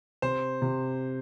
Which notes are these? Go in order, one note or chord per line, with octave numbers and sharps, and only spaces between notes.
C3 C5
C3